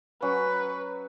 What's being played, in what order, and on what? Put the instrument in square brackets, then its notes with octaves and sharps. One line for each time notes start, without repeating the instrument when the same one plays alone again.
[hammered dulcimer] F#3 C#4 F#4 [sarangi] B4